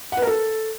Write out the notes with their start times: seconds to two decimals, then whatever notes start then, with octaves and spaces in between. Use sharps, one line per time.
0.12 F#5
0.17 B4
0.22 A#4
0.27 A4